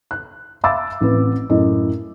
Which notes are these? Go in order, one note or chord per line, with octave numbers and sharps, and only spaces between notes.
F#6
E5 F5 B5 D6 E6 A6
A1 C4 B4
F#2 A2 D#5